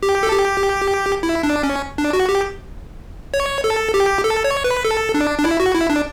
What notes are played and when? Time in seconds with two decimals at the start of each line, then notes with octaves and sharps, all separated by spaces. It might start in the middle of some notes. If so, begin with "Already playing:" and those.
0.03 G4
0.23 A4
0.33 G4
1.23 E4
1.43 D4
1.63 C#4
1.98 D4
2.13 F#4
2.29 G4
3.34 C#5
3.64 A4
3.94 G4
4.24 A4
4.44 C#5
4.64 B4
4.85 A4
5.14 D4
5.38 D4
5.45 E4
5.60 F#4
5.75 E4
5.90 D4